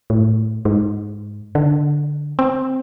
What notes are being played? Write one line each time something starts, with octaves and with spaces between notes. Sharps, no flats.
A2
G#2
D3
C4